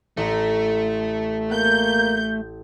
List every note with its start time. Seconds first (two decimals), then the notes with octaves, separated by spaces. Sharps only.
0.17 A1 A3 A#5
1.52 A#3 G6